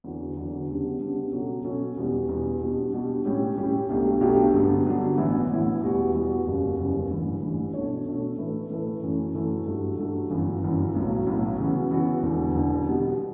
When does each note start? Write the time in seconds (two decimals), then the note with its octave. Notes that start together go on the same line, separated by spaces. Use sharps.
0.04 E2 D3 F#3
0.37 E2 D3 F#3
0.68 C#3 G3 B3 D4
1.00 C#3 G3 B3 D4
1.33 B2 F#3 C#4 F#4 A4
1.64 B2 F#3 C#4 F#4 A4
1.97 E2 B2 G3
2.29 E2 B2 G3
2.61 B2 G3 D4
2.93 B2 G3 D4
3.25 A2 G3 C#4 G4
3.57 A2 G3 C#4 G4
3.89 B1 B2 A3 D4 G4
4.21 B1 B2 A3 D4 G4
4.54 G2 D3 F#3 B3 D4
4.85 G2 D3 F#3 B3 D4
5.17 A1 A2 E3 B3 E4
5.49 A1 A2 E3 B3 E4
5.81 E2 B2 G3 B3 F#4
6.14 E2 B2 G3 B3 F#4
6.46 F#1 E2 C#3 G3
6.78 F#1 E2 C#3 G3
7.10 A1 G2 E3
7.42 A1 G2 E3
7.74 B2 A3 D4 A4 C#5
8.06 B2 A3 D4 A4 C#5
8.38 A2 E3 A3 E4 B4
8.70 A2 E3 A3 E4 B4
9.03 F#2 E3 A3 C#4
9.34 F#2 E3 A3 C#4
9.67 G2 F#3 A3
9.98 G2 F#3 A3
10.30 G1 F#2 E3
10.63 G1 F#2 E3
10.95 B1 A2 F#3
11.27 B1 A2 F#3
11.58 C#3 E3 B3 F#4
11.91 C#3 E3 B3 F#4
12.23 E1 E2 D3
12.56 E1 E2 D3
12.87 B2 G3 B3